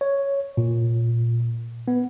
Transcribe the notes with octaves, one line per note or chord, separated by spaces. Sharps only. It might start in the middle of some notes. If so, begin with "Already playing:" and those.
C#5
A#2
B3